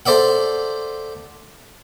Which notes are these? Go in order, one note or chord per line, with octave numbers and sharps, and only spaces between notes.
A4 C5 D5 E5 F#5